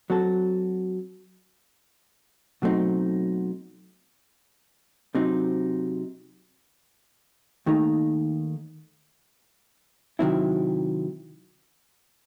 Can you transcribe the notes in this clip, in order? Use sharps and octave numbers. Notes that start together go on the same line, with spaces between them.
F#3 C4 F#4 A4
B2 F#3 A3 C4 D#4
C3 F#3 C4 D#4
D#2 D#3 A3 D#4
C3 D#3 F#3 C4 E4